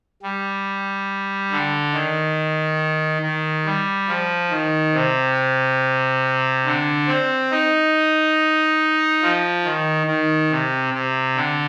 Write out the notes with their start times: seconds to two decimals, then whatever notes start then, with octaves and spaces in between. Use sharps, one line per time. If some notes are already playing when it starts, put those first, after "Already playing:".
0.23 G3
1.51 D3
1.94 D#3
3.22 D#3
3.66 G3
4.08 F3
4.51 D#3
4.94 C3
6.65 D3
7.07 C4
7.51 D#4
9.22 F3
9.65 D#3
10.07 D#3
10.51 C3
10.94 C3
11.36 D3